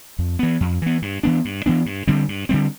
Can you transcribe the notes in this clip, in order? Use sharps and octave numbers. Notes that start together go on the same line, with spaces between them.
F2
E3 B3
F2
E3 B3
G2
E3 B3 D4
G2
E3 B3 D4
G2
D3 G3 C4
G2
D3 G3 C4